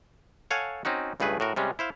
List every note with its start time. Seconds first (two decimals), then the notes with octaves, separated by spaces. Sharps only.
0.51 A4 C#5 F5 F#5 G#5
0.85 C4 C#4 D#4 F#4
1.20 C#2 G2 A3 G#4 B4
1.40 A2 F#4 A#4
1.56 C3 G3 G#3 C#4
1.79 E4 C5 F5